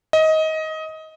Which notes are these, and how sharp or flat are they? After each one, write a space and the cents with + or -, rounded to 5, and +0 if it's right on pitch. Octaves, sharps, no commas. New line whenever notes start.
D#5 +20